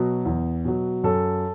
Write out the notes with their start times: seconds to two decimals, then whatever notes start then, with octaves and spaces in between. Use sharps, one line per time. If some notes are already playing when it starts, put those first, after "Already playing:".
Already playing: B2 F#3
0.25 E2
0.65 B2 F#3
1.04 F#2 A4